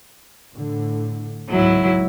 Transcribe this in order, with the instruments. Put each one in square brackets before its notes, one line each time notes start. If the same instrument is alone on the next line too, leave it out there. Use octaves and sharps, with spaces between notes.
[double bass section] A2 D3
[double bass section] G#1 C#2 G#2 [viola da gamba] F#3 E4